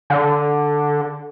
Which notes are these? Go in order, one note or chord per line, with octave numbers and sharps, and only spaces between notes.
D3